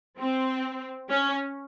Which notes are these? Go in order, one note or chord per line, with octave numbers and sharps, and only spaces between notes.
C4
C#4